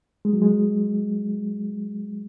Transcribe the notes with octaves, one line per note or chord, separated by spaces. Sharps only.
G#3
F#3
G#3